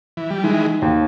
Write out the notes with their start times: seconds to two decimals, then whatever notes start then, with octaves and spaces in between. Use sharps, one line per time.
0.17 E3
0.30 G3
0.44 D#3 E3 G#3
0.82 D#2